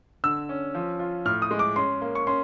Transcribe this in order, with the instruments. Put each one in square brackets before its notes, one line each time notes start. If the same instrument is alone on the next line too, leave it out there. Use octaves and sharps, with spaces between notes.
[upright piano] D3 [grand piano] E6
[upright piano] C#4
F3
F4
[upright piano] A2 [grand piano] F6
[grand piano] D#6
[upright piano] G#3
[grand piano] D6
[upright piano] C#4 [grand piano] C6
[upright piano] A#3
[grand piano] C#6
[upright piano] C#4 [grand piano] C6